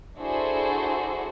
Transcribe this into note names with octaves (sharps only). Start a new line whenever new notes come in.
D4 E4 F#4 G#4 A4 C5